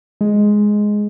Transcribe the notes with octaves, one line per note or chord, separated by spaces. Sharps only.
G#3